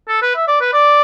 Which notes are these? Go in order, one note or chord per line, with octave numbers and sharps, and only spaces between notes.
A4
B4
E5
D5
B4
D5